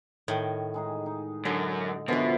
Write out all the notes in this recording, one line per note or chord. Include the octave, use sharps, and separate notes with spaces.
A2 D#3
G#3 D#4 G#4
D#4
F#2 D3
F#2 B2 D3 E3 F3 D4